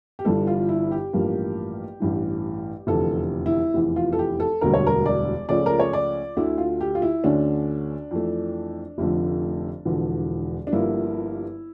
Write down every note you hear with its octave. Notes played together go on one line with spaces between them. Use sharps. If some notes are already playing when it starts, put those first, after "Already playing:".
G4
G1 G2 E3 G3 A4
F4
E4
G4
A1 G2 F3 A#3
A1 G2 E3
F1 E2 D3 A4
E4
F1 E2 E3
F4
A4
G4
A4
E1 D2 D3 G3 A#4
C#5
A#4
D5
C#2 C#3 F3 A3 C#4 D5
A#4
C#5
D5
D2 D3 A3 E4
F4
G4
F4
E4
D2 D3 A3 C#4 D4
F2 E3 A3
F1 F2 D3 F3 A3
E1 E2 D3 F3
D4
G1 G2 D3 F3 A#3 E4